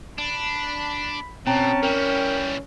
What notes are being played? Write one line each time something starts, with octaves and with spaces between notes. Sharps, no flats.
D4 B5
B2 C4 C#4 G5 A5 A#5
E3 G3 A#4 G5